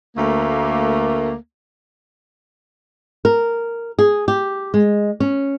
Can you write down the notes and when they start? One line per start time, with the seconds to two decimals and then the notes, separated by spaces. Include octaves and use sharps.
0.17 D2 A3 A#3
3.25 A#4
3.99 G#4
4.28 G4
4.74 G#3
5.20 C#4